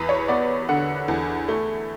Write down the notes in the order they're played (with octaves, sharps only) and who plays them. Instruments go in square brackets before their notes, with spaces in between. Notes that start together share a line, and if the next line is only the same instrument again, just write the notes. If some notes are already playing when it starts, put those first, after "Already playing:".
Already playing: [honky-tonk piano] E2 B4
C#5
B3 D5
D3 F#5
E2
A3